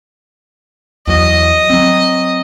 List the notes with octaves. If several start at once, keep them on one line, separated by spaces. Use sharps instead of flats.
E2 F#3 D#5
F#3 C4